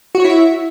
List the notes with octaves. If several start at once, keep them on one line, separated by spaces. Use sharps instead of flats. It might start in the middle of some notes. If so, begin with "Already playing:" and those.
E4 F#4 C#5 E5